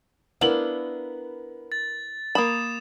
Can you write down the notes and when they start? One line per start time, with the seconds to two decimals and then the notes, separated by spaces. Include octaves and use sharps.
0.41 B3 D4 E4 A#4 B4 F5 F#7
1.72 A6
2.35 A#3 B5 D#6 E7